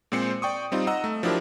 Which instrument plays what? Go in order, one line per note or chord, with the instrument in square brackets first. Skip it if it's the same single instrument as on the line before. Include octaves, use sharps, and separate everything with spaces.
[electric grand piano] A#2 G#3 C4 C5 C#7
D5 G5 C#6 D#6
G3 C4 D#4 F4
D#5 F#5 A#5 E6
A3
F3 F#3 D4 E4 G4 A#4